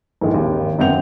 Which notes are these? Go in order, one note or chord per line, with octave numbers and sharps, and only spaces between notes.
A#1 G#2 D#3 E3 G#3
G#1 D#2
G1 F#2 C4 F#5 G6 F7